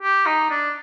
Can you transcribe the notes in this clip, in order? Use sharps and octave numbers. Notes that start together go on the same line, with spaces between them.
G4
D#4
D4